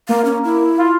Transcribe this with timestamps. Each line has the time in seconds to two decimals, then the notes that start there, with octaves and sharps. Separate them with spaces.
0.09 A#3 F5
0.25 C#4
0.44 E4
0.78 F4